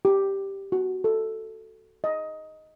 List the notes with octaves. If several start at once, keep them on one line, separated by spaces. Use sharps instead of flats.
G4
F#4
A4
D#5